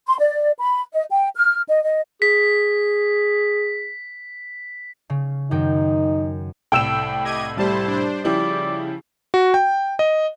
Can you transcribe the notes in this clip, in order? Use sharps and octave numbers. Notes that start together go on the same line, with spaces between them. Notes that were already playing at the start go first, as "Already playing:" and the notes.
C6
D5
B5
D#5
G5
F6
D#5
D#5
G#4 B6
C#3
F#2 D#3 D#4 G5
C2 A2 G5 E6 E7
G4 D#5 G#6 D#7
G3 A3 E4 C5 A5
D4 C5
C#3 F3 E4 G4 D5
F#4
G5
D#5